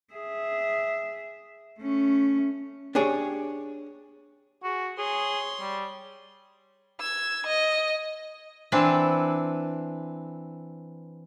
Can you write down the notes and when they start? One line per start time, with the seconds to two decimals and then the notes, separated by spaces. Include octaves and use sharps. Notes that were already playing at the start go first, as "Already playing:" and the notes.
0.14 G#4 E5
1.80 A3 C#4
2.95 D4 G4 G#4 C#5
4.63 F#4 G#4
4.98 G#4 C#5 C6
5.61 G3
7.00 E6 G#6
7.47 D#5
8.72 E3 C4 D4 E4 B4